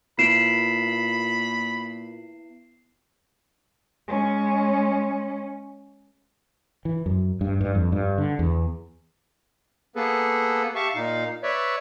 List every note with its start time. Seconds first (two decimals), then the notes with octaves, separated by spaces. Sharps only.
0.19 A#2 B3 E4 B5 C7 D7 E7
4.08 G#3 C#4
6.85 E3
7.06 F#2
7.41 G2
7.61 G2
7.75 F2
7.92 G2
8.18 D3
8.39 E2
9.96 A#3 B3 G#4 A4 B4
10.75 G4 E5 F5 A5 C#6
10.95 A#2 D#4 F5
11.43 B4 C#5 D5 E5